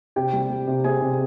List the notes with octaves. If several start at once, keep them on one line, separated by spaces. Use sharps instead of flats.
C3 G4 G5
G3
G3
C3
C4 G#4 G#5
C3